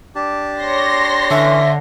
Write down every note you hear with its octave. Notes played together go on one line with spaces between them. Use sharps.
D4 G4 A5
C#5 C6 A#6
D3 E3 C#4 E5